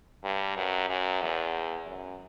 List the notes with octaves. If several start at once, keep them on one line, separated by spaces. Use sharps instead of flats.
G2
F#2
F#2
E2
F#2